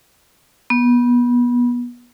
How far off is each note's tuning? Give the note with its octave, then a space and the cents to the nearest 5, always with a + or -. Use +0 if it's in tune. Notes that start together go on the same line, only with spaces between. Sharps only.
B3 -25